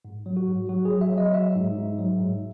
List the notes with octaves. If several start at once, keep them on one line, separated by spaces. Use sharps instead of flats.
G#2
F#3
F#4
G#2
F#3 F#4
G#4
F#3
E5
F#3
D#5
F#3 E5
G#2
G#2
F#3
G#2